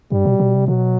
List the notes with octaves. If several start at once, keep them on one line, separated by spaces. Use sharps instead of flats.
G2 G3
B2
B2
C3
B2 F#3